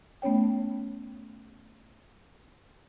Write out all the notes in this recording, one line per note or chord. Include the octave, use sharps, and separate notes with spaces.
A3 B3 C#4 C#5 G5